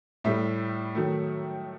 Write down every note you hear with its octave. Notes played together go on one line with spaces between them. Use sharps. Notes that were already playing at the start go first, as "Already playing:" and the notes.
A2 G3 E5
D#3 F#3 A3